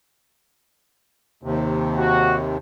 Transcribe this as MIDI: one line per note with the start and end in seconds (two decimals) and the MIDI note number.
1.43 2.58 39
1.43 2.58 48
1.95 2.34 66